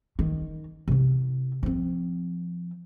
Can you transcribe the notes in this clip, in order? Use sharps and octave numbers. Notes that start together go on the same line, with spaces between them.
D#3
C3 E4
F3 C4